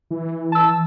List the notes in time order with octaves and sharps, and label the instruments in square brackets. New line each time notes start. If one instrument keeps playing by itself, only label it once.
[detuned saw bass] E3
[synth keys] A5 E6